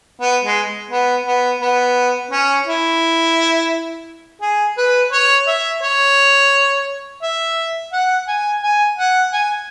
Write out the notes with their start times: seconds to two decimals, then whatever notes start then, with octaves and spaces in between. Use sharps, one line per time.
0.21 B3
0.44 G#3
0.91 B3
1.26 B3
1.62 B3
2.31 C#4
2.67 E4
4.42 G#4
4.78 B4
5.12 C#5
5.48 E5
5.82 C#5
7.23 E5
7.92 F#5
8.28 G#5
8.63 G#5
8.98 F#5
9.33 G#5